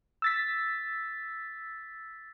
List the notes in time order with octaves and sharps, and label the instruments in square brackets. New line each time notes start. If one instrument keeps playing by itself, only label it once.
[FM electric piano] E6 A6 B6